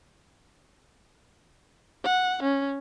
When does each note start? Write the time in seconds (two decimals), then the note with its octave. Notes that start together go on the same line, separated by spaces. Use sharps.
2.04 F#5
2.43 C#4